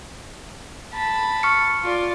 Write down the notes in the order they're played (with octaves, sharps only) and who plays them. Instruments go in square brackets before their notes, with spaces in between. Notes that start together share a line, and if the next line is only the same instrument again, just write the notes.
[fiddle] A5 B5
[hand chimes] C#6 F6 C#7
[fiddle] F4 D5